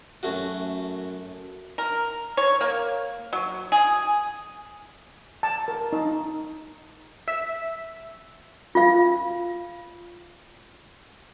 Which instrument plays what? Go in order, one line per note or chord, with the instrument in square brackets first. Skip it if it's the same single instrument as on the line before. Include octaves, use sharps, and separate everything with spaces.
[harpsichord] F#2 A3 F#4
[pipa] A#4
C#5
A#3
F#3
G#4
[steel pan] A5
A#4
D#4
[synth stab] E5
[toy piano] F4 F5